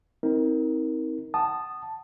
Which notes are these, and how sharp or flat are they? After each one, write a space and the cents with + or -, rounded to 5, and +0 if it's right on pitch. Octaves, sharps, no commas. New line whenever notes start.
C4 +0 D#4 +35 A#4 +0
F#5 +30 A5 +0 D#6 -15